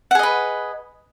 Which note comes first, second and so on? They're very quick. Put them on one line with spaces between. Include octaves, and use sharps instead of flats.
F#5 G#4 D#5 B4